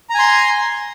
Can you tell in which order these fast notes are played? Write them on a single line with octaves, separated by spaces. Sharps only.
A#5 G#5 C6